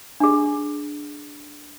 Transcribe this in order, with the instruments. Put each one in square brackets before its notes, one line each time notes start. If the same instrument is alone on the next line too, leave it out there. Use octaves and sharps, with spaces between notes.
[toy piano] D4 G#4